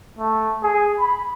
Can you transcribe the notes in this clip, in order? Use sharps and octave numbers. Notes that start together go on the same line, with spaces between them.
A3
G#4
B5